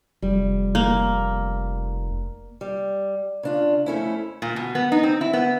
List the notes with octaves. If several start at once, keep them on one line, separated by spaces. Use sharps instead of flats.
F1 G3
A#3
G3
C#3 D4 F4
F2 A3 C#4 E4
A#2
B2
B3
D#4
C4
E4
B3